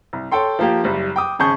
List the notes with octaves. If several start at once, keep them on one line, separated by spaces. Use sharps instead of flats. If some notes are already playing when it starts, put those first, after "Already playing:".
C2
A4 C#5 G5 C6
F3 A#3 G4
F#1 G3
G5 D6 D#6
G#1 C#3 G#4 A5 C#6 G6